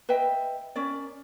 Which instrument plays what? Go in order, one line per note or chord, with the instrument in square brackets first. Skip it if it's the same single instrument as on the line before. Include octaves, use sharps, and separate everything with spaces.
[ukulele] B4 D#5 E5 G5
C#4 A#4 D5